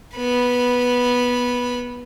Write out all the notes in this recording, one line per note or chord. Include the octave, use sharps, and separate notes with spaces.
B3 B5